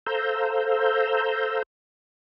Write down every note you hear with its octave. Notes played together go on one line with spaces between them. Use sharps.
A4 C5 F5 A#5 E6 G6